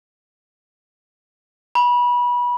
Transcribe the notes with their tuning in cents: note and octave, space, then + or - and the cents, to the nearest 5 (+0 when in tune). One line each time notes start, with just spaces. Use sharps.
B5 -25